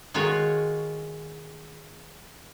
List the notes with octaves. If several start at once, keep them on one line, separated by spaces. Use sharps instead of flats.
D#3 G#3 F4 F#4 C#5